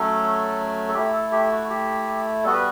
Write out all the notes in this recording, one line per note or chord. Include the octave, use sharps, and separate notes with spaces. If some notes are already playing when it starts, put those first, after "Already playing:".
Already playing: F#3 A3 C#4 A4
A4
A3 E4 G4
A4
G4
F#4
G4
G3 B3 F#4 A4
B4